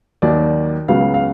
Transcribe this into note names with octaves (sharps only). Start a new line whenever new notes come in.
D#2 D#3 F#3 D5
C#2 C#3 F#3 B3 F5
F5